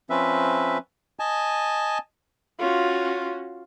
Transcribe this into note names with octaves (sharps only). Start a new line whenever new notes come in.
F3 C4 C#4 B4 E5
D#5 G#5 A5
C#4 F4 F#4